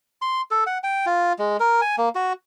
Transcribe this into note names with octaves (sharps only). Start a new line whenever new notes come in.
C6
A4
F#5
G5
F4
G#3
A#4
G#5
A#3
F#4